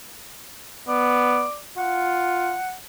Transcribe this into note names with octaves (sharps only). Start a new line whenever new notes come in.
B3 D5
F4 F#5